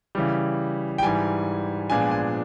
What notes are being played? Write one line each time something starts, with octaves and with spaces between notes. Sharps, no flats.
C#3 E3 G3
G5
G#2 E3 G3 G#5
A#2 F3 G#3 B3 D4 G#5
G#5